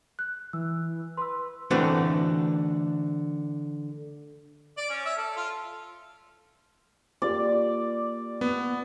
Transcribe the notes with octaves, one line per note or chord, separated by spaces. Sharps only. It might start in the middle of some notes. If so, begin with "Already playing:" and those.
F#6
E3 E6
B4 C6 E6
D3 E3 A3 C4 F#4 B4
D5
C#4
E5
A4
F4
A#3 F4 G4 D5
B3